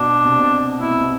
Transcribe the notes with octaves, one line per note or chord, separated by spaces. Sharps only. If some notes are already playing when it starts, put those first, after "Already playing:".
Already playing: B2 D4
C3
B2
B2 E4
C3
B2